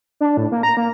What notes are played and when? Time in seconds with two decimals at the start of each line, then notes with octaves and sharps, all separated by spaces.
0.21 D4
0.37 A2
0.52 A#3
0.63 A#5
0.77 A#3